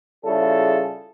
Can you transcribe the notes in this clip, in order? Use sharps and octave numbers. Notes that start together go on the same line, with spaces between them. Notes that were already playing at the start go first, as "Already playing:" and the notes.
C#3 G3 E4 F4 G#4 A4